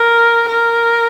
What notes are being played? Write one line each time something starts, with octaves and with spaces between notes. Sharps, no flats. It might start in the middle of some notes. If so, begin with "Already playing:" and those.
Already playing: A#4
A#4